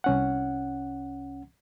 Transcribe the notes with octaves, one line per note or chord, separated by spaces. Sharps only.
C2 C#4 F#5